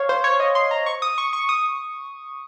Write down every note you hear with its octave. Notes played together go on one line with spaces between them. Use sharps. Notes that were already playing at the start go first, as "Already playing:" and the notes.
Already playing: C#5 F5
C5
C#5
D#5
C6
A#5
C#6
D#6
C#6
C#6
D#6